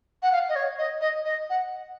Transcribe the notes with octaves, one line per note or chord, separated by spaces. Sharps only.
F#5
F5
D#5
C#5
D#5
D#5
D#5
F#5